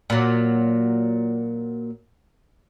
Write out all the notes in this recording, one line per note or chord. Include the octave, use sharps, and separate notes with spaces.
A#2 F#3